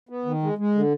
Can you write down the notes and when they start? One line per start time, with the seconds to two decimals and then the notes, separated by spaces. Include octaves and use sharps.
0.09 B3
0.26 D#3
0.43 G#3
0.58 G#3
0.75 D3